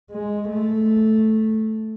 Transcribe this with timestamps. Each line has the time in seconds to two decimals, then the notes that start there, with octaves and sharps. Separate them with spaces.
0.12 G#3
0.50 A3